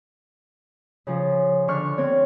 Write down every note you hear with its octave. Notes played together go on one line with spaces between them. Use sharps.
C#3 F3
D3 C#6 F6 F#6
C4 C#5